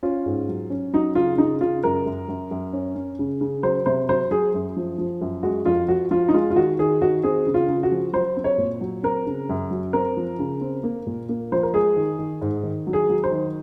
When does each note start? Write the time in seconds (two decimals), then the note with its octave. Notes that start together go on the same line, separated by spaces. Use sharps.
0.03 C#4 F4
0.26 G#2
0.49 F#3
0.70 C#4
0.93 F#3 D#4
1.15 C#3 F4
1.38 C#3 D#4
1.61 C#3 F4
1.83 F#2 A#4
2.06 F#2
2.28 F#2
2.51 F#2
2.73 C#4
2.95 C#4
3.19 C#3
3.41 C#3
3.63 F#3 C5
3.86 C3 C5
4.09 F#3 C5
4.31 F#3 G#4
4.54 F#2
4.77 F3
4.98 F3
5.21 F#2
5.43 G#3 F#4
5.66 F2 F4
5.88 F3 F#4
6.11 F3 F4
6.28 D#4
6.34 G#3 F4
6.51 F4
6.56 D#3 F#4
6.79 D#3 G#4
7.02 D#3 F#4
7.23 C4 G#4
7.47 C#3
7.54 F4
7.68 C#3
7.83 F#4
7.91 F3
8.13 F#3 C5
8.37 C4
8.44 C#5
8.58 A#2
8.81 F#3
9.03 C4 A#4
9.26 C#3
9.49 F#2
9.71 F#3
9.93 C4 A#4
10.17 F3
10.39 C#3
10.61 C4
10.83 A#3
11.07 A#2
11.29 A#3
11.52 F3 C5
11.63 A#4
11.73 G#3 G#4
11.96 D#3
12.19 D#3
12.41 G#2
12.63 D#3
12.87 F#3
12.93 G#4
13.09 F#3
13.24 C5
13.31 D#3